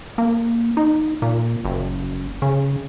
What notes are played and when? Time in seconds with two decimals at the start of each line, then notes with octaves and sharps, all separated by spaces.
0.18 A#3
0.77 D#4
1.22 A#2
1.65 F#1
2.42 C#3